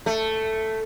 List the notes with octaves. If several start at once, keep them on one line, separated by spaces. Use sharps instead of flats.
A3